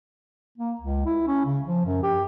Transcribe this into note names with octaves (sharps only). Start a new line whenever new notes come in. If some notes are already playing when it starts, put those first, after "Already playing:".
A#3
C#2
E4
C#4
C#3
F3
F#2
G4